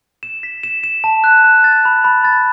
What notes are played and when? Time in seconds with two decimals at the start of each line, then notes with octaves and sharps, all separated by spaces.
0.23 E7
0.43 B6
0.63 E7
0.84 E7
1.04 A5
1.24 F#6
1.44 F#6
1.64 A6
1.85 B5
2.04 B5
2.25 A6